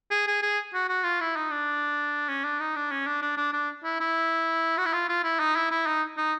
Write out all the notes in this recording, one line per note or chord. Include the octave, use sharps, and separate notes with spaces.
G#4
G#4
G#4
F#4
F#4
F4
E4
D#4
D4
C#4
D4
D#4
D4
C#4
D4
D4
D4
D4
E4
E4
F#4
E4
F4
F4
E4
D#4
E4
E4
D#4
D#4